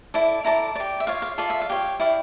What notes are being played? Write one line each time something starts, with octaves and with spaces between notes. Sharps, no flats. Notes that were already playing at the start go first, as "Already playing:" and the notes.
E4 A4 D5
E4 A4 D5 A#5
G4 D5
E5
F4 C#5 F5
F5
F4 A4 D5 F5
E5
F5
G4 C#5
E4 G4 D5 F5